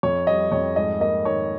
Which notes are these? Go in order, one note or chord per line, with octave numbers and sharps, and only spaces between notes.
F2 C#5
G3 D#5
F2 C#5
G#2 D#5
A#3 D#5
D#3 C#5